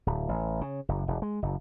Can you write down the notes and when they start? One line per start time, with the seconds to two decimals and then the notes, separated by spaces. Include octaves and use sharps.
0.07 D1
0.29 A1
0.61 C#3
0.89 F#1
1.08 E1
1.22 G#3
1.42 F#1